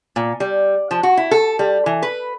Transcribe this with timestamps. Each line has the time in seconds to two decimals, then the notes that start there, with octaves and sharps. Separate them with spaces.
0.16 A#2
0.40 G3
0.91 F3
1.03 F#4
1.17 E4
1.31 A4
1.59 G3
1.86 E3
2.02 B4